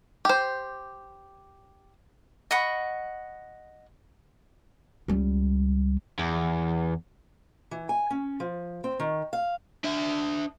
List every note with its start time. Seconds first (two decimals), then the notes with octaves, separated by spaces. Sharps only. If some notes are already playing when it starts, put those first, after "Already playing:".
0.25 G4 C5
2.51 D#5 F#5 B5 C#6
5.08 C#2 G3
6.19 E2
7.71 E3
7.89 G#5
8.10 C#4
8.40 F3
8.84 C4
9.00 D#3
9.33 F5
9.84 D4 E5